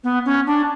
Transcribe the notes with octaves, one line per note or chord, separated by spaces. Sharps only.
B3
C#4
D4